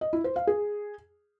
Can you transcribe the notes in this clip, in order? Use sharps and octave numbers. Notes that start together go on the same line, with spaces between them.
D#5
E4
C5
F5
G#4